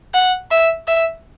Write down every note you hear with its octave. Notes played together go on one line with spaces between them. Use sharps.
F#5
E5
E5